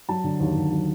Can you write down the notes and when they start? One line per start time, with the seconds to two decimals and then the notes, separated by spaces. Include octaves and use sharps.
0.09 F#3 A5
0.24 D3
0.40 D#2
0.56 D#2
0.72 F#3